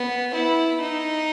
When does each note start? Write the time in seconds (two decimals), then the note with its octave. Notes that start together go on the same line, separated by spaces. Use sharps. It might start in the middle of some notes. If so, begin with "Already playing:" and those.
Already playing: B3
0.34 E4
0.81 D#4